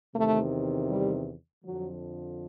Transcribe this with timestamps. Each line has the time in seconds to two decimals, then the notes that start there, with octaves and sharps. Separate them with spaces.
0.15 E2 C3 D#3 A3
0.90 G3
1.65 F2 D3 F3 F#3